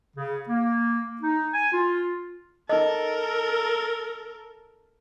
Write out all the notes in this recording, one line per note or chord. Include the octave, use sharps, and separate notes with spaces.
C#3
A#3
D#4
G#5
F4
D#4 A4 A#4 D#5